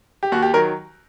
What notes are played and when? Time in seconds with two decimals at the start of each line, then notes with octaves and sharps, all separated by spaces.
0.23 G4
0.32 D#2 F#4
0.42 G4
0.53 D#3 F#3 A#4